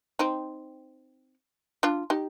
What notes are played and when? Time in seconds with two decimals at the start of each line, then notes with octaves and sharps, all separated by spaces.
0.19 C4 D#4
1.83 D4 F4
2.10 D#4 G4